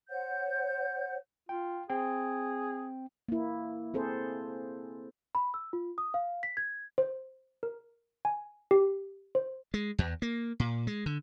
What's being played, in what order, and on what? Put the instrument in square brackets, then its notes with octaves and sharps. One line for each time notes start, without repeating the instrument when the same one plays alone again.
[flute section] C5 C#5 F#5 G6
[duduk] F4 [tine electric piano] G5
[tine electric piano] C4 G5 [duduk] G#4
[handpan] A#3 E4
C4 G#4 A4 C5
[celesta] B5
E6
F4
D#6
F5
B6
G#6
[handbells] C5
A#4
G#5
G4
C5
[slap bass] G#3
E2
A#3
A#2
G#3
D3